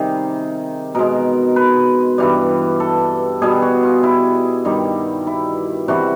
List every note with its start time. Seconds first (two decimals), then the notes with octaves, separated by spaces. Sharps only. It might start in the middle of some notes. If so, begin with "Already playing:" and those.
Already playing: C3 D#3 G3 G#4
0.95 B2 G#3 A#4
1.56 B4
2.18 G2 E3 G3
2.80 A4
3.42 B2 G3 G#4
3.62 F#4
3.83 F4
4.03 E4
4.65 G2 D#3 G3
5.27 E4
5.88 C3 E3 G3 F#4